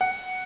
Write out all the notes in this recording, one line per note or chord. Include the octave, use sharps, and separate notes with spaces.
F#5